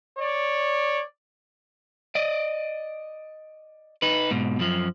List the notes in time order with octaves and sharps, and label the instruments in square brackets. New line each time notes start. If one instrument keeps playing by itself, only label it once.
[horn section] C#5 D5
[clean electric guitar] D5 D#5
D#4 B4
G#2 B2
F#2 F3